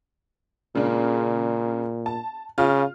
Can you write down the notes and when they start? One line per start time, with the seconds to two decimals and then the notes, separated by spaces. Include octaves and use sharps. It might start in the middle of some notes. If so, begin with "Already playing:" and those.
0.75 A#2 C#3 G#3 D4
2.06 A5
2.58 C#3 F4 F6